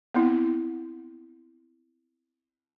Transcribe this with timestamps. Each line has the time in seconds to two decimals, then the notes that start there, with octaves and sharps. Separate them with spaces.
0.14 B3 C4 E4